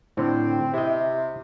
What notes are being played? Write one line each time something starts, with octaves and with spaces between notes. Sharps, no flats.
A2 D3 C4
C3 E4 D#5